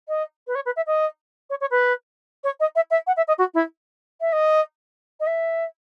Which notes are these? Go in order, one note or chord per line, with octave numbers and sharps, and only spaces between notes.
D#5
B4
C#5
B4
E5
D#5
C#5
C#5
B4
C#5
D#5
E5
E5
F#5
E5
D#5
F#4
E4
E5
D#5
D#5
E5